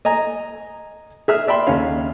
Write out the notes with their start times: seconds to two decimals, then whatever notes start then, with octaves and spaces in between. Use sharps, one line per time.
0.05 D#5 G#5 A#5
1.28 G#4 E5 F6
1.47 D5 E5 G5 B5 C6
1.67 D#2 D3 C#4 F5